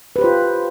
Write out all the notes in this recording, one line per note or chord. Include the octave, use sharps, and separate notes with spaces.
F4 G4 B4 C5